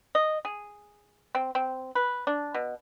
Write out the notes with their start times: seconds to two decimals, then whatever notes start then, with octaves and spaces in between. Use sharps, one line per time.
0.15 D#5
0.45 G#4
1.35 C4
1.55 C4
1.95 B4
2.27 D4
2.54 B2